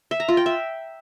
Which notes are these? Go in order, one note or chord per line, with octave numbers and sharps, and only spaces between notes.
E5
A#5
F4
G5
E5